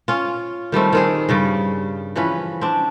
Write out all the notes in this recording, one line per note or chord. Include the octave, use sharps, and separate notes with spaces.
C#4 F4
D#3 G3 A3 C4
D#3 C4 G#4
G2 C#3 G3
E3 F3 C#4 B4
C4 D4